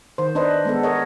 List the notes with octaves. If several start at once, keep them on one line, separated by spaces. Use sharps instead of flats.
D#3 C5
D4 D#4 B4 C5 D#5
G#3 B3 A4
G#4 A#4 C#5 D#5